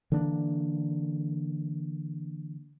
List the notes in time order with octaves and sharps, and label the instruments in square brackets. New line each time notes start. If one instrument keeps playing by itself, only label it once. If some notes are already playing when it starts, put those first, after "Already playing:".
[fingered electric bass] D3 E3 A#3 D4